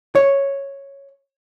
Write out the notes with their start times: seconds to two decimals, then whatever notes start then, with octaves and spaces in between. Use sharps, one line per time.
0.15 C#5